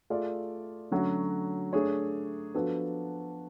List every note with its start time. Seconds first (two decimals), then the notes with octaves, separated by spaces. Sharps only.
0.10 A3 F4 G#4 D5
0.91 D3 F#3 A3 C#4 F#4
1.73 A3 D4 G#4 C#5
2.55 F3 B3 D4 F#4 A4